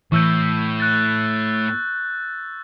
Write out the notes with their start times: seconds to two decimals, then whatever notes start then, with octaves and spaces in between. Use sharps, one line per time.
0.12 A2 E3 C#6 E6 G6
0.80 F#6 A6